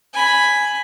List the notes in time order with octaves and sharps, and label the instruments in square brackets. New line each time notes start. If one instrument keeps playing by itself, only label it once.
[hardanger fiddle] G#5 B5